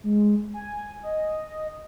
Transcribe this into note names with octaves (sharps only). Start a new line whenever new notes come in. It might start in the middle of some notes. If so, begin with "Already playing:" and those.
G#3
G#5
D#5